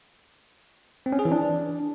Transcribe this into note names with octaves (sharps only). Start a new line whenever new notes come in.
C4
C#4
G#4
E3
D4